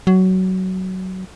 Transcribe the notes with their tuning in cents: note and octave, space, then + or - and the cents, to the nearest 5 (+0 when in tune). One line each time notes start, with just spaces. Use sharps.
F#3 +15